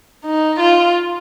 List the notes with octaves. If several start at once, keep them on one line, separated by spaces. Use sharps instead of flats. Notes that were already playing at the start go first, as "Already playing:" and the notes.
D#4
F4